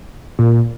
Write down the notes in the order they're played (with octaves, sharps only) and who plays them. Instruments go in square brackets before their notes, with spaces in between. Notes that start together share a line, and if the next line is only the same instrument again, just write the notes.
[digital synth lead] A#2